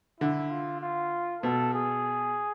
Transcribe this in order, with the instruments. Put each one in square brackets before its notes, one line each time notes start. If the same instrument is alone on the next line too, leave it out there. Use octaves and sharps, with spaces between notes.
[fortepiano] D3 [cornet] E4
[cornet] F4
F4
[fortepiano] B2 [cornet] A4
[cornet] G#4